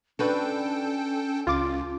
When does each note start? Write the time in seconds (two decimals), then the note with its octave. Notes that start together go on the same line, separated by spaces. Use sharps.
0.19 C#4 D4 F#4 A4 B4 G5
1.47 C#2 F4 D6 A6